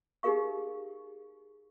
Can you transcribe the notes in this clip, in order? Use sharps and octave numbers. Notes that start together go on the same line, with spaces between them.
D#4 G4 G#4 A#4 F5 C#6